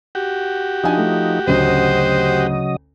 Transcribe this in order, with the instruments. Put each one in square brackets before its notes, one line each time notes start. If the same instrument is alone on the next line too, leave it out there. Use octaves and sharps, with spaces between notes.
[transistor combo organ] F#4 G4
[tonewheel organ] F3 D#4 [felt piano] D4 G#5
[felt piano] A3
[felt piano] A1 D2 [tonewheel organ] C#3 F#3 D#5 [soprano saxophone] C5